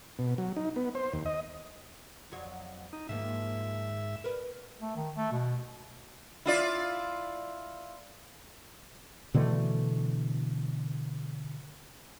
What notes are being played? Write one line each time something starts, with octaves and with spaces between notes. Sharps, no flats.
B2
F#3
D#4
B3
C5
D#2
D#5
F2 F#3 C#5
D#4
G#2 D#3 F3 A#3 E5
A#4 B4
A3
D#3
A3
B2
E4 F4 D5
B2 D3 E3 A3